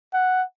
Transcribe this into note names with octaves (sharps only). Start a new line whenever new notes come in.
F#5